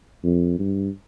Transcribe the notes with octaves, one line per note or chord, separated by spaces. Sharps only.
F2
G2